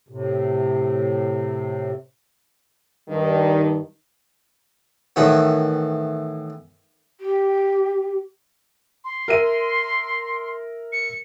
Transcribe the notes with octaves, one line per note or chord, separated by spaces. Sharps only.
A2 C3
G2 D#3
A2 D#3 E3 B3
G4
C6
A#4 E5 D#7
C#7